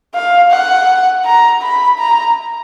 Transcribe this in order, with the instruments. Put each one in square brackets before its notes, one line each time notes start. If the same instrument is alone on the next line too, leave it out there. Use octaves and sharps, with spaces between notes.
[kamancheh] F5
F#5
A#5
B5
A#5